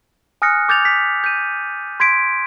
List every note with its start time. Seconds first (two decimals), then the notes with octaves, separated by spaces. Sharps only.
0.42 G#5 D#6 F6 F#6 A#6 C#7
0.69 D6 G6 A6 F7
0.85 B6
1.24 G6 D#7
2.00 C6 G#6 B6 D7